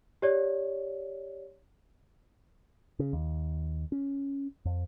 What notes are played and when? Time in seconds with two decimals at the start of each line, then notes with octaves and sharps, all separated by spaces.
0.22 G4 C#5 D5
2.99 C#3
3.13 D#2
3.92 C#4
4.65 F2